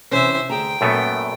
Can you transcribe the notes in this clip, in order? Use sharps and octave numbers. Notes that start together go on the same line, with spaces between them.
C3 E3 C#4 C5 E5
D2 G#4 G5 A#5
F#2 A#2 A3 B3